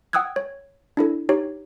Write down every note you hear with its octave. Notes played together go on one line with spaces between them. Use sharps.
F#5 G5 D#6 E6 F#6 G#6
C#5
D4 E4 A4
D#4 G4 C#5